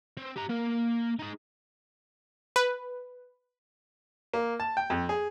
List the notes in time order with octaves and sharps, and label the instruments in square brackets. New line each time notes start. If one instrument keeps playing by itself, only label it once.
[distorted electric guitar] C4
G4 A#5
A#3 A#4
D#4 G#4
[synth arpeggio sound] B4
[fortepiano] A#3
A5
G5
F2
G#4